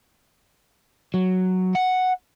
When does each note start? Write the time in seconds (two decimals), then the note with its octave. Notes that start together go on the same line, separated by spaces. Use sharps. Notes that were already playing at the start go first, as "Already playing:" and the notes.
1.14 F#3
1.75 F#5